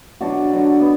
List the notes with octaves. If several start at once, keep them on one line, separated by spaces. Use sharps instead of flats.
B2 F#3 D4 F#4
D3 F#3 D4
B3